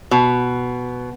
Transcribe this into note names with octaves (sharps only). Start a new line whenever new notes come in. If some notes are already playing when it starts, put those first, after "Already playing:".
B2